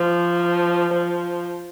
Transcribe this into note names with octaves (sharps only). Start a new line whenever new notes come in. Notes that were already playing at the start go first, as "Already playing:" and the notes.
Already playing: F3
F3